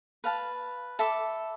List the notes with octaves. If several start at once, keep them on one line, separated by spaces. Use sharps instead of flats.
B4 F5 A5
A4 E5 B5 D6